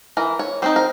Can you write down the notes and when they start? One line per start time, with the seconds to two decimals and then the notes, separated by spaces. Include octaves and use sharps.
0.17 E3 A#4
0.39 C#5
0.62 G3 C4 D#4 C5
0.76 A#4